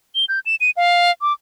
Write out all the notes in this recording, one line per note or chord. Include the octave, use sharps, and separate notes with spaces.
G7
G6
E7
D#7
F5
D6